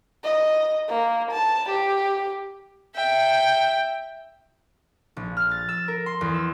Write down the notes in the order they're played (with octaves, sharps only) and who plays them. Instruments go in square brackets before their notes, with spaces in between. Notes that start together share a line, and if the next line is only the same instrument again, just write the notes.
[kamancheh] D#5
A#3
A5
G4
[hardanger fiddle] E5 G5
[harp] A#1
F6
A6
E6
A#4
C6
E2
E6